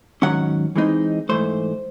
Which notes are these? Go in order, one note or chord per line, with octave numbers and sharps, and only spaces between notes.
G#2 D#3 F#3 C#4 F#5
E3 G#3 C4 D#4
G#2 E3 A3 C5